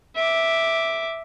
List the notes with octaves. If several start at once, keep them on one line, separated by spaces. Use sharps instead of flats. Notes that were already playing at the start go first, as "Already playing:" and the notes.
E5 D6